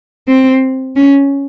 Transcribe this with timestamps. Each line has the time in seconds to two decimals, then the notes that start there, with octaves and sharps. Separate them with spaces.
0.28 C4
0.96 C#4